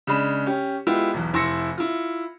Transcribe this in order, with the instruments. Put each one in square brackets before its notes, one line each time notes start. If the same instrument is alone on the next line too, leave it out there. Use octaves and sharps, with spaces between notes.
[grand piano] C#3 G#3 D4 B5 E7
C#4 G4
G#3 B3 E4 F4 G4
B1 E2
F1 E4 C6 E6 A#6 C#7
E4 F4